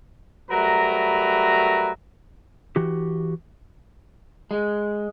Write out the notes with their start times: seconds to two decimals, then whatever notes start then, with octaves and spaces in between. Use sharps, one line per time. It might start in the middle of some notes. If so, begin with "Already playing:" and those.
0.51 F#3 G3 A3 A#4 B4 A#5
2.76 E3 F#4 G4
4.51 G#3